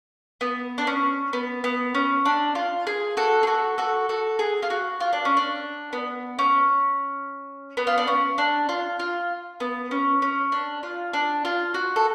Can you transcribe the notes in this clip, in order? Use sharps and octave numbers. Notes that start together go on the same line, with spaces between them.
B3
D4
C#4
B3
B3
C#4
D4
F4
G#4
F#4 A4
G#4
F#4 A4
F#4 A4
F#4 A4
G#4
F4
F#4
F4
D4
C#4
D4
B3
C#4
B3
F4
D4
C#4
D4
F4
F4
B3
C#4
C#4
D4
F4
D4
F4
F#4
A4